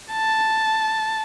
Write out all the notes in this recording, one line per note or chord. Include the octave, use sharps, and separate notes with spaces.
A5